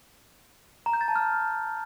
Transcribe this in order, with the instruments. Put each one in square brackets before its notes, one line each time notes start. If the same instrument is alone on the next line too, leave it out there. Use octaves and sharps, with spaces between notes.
[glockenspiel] A#5
G6
A6
A5
F6